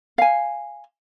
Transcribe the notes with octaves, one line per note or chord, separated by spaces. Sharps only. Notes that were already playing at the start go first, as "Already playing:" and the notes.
F5 G#5